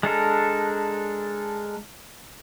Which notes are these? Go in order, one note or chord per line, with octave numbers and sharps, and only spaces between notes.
G#3 D4 A4 A#4